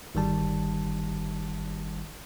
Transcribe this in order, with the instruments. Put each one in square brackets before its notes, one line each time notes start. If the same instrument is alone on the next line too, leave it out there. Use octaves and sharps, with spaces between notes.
[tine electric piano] G1 D#3 G3 A5